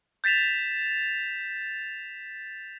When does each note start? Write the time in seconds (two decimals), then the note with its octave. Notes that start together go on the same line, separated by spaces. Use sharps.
0.24 G6 A6 B6 E7 F7